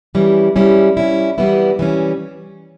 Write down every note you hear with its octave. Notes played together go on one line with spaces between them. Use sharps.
E3 G3 C#4 E4
G3 C#4 E4
G3 C#4 E4
E3 G3 B3 E4
E3 G3 C#4